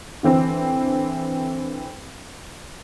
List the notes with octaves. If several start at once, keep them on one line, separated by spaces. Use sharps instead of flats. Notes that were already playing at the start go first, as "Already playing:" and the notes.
D3 E3 C4